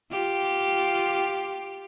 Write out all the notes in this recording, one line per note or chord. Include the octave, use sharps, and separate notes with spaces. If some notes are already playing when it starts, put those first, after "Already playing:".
F4 G4